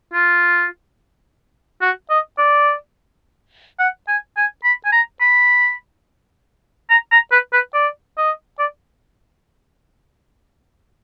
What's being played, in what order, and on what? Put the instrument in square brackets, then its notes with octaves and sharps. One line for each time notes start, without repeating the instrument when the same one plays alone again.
[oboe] F4
F#4
D#5
D5
F#5
G#5
G#5
B5
G#5
A#5
B5
A#5
A#5
B4
B4
D5
D#5
D5